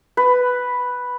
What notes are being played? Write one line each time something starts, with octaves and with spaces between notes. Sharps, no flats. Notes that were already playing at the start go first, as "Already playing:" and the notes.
B4